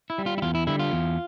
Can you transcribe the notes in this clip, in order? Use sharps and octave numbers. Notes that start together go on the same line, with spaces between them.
E4
G3
F4
E4
E2 F4
E4
D3 G3 E4
F4
E2